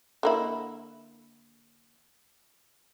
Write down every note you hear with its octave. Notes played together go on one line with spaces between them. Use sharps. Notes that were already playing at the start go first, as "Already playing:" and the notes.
D3 A#3 E4